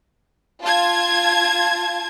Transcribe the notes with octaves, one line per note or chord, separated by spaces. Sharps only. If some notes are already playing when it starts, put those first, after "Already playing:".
F4 A5 G#6